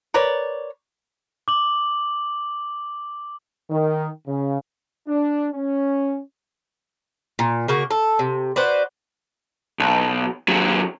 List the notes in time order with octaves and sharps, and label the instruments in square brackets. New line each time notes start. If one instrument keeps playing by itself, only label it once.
[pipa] A#4 B4 C#5 D5
[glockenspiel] D6 F#7
[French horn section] D#3
C#3
[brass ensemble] D4
C#4
[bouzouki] A#2
C#3 A#3 F#4
A4
C3
F#4 B4 C5 D5
[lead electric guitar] B1
D#2 F#3